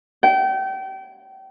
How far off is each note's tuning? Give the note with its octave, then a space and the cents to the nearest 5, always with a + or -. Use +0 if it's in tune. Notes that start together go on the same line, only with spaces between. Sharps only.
G5 -30